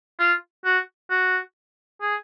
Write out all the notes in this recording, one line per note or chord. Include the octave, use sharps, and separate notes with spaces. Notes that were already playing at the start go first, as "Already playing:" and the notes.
F4
F#4
F#4
G#4